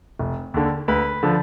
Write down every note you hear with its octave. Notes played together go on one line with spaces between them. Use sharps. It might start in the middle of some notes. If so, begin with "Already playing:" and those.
F1
D#2 D3
D2 B4
D3 F3